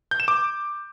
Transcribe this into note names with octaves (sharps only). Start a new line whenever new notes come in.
G6
E7
D6